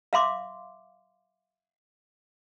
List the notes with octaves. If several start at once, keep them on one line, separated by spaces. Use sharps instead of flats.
E5 F5 C6 D6